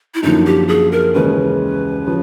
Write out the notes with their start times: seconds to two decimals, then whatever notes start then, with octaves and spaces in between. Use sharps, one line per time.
0.15 E4
0.23 F#2 D3 F3 A#3 D#4
0.46 G4
0.68 G#4
0.92 A#4
1.14 D#2 C#3 E3 G#3 B4
2.07 C#3 F3